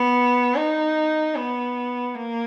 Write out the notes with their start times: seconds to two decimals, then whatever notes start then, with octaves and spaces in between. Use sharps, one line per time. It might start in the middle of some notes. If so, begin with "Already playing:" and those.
Already playing: B3
0.55 D#4
1.35 B3
2.14 A#3